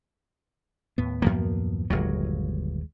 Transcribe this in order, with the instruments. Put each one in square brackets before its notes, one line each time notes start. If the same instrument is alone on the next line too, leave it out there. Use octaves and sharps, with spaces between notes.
[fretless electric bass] D#2 A2 B3
[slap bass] F#2 F3 A#3
[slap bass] G1 A#2 F#3 [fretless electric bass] D#2 G#3